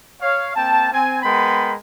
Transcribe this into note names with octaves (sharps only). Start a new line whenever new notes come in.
C#5 F5
A#3 C4 G5 A5
C4 G#5
G#3 B3 A#4 G5 B5 C6